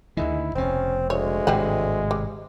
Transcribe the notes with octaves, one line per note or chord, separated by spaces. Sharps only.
D2 D3 D#3 G#3 E4
F1 B2 C4 C#4
D2 G#3 C#5
G#1 A2 C3 G3 D#5 F#5
G3